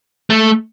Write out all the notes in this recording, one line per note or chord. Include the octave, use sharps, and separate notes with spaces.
A3